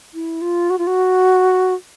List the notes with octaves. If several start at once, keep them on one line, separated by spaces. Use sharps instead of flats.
E4
F4
F#4
F4
F#4